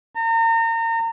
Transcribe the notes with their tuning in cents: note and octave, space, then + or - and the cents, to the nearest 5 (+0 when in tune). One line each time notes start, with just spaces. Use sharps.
A#5 -35